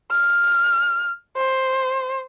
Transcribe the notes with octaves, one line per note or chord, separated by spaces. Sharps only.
F6
C5